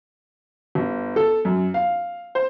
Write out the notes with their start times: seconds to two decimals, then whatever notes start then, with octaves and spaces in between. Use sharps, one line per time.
0.75 G1
1.16 A4
1.45 F#2
1.74 F5
2.35 C5